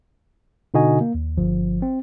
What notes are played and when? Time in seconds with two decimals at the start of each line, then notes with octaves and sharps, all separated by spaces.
0.74 B2 D3 D#4 F#4 D#5 G#5
1.01 A#3
1.15 D#2
1.37 G1 F3
1.82 C4